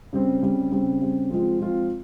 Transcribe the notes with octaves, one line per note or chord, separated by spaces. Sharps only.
C#3 G3 C4
C#3 G3 C4
C#3 G3 C4
C#3 G3 C4
F3 G#3 C4 F4
F3 G#3 C4 F4